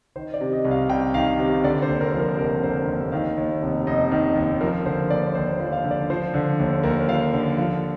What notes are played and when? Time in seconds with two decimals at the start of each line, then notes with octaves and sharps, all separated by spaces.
0.16 D#3 C5
0.34 D5
0.41 C3
0.53 D#5
0.65 C2
0.71 F5
0.89 C2 G5
1.14 D#3 F5
1.39 C3
1.64 D3 D5
1.82 C5
1.88 D#2
2.01 A#4
2.14 F3
2.20 A#4
2.38 F1 A#4
2.63 D3 C5
2.88 D#2
3.12 D#3 F5
3.37 D#2
3.62 F1
3.87 F1 D#5
4.11 D#3
4.36 D#2
4.61 F3 A#4
4.85 D3 C5
5.10 D#2 D5
5.35 D#2 C5
5.60 F3
5.72 F5
5.84 D3
5.91 D5
6.10 F3 C5
6.34 D3
6.59 D#2
6.83 D#2 A#4
7.08 F3 F5
7.34 D3
7.58 F3 F5